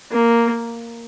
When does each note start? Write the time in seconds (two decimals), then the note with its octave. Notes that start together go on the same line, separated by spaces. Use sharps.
0.11 A#3